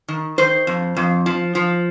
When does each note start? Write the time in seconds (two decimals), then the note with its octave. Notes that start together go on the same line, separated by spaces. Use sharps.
0.08 D#3
0.38 D#3 C5
0.67 F2
0.96 F2
1.26 F3
1.55 F3